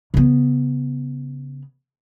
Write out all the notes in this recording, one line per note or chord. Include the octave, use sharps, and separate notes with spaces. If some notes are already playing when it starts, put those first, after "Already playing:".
C#3 B3